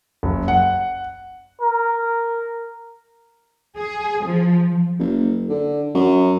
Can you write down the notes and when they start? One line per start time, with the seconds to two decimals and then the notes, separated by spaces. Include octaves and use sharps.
0.23 F#1
0.48 F#5
1.62 A#4
3.77 G#4
4.25 F3
4.99 F#1
5.49 D3
5.95 F#2